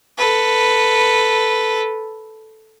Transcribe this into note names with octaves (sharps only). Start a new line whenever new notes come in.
A4 B4